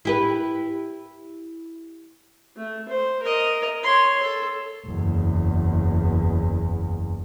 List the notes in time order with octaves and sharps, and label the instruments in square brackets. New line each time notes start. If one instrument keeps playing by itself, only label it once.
[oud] E4 G4 B4
[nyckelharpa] A3
C5
A#4 D#5
C#5 C6
A4
[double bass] F#1 E2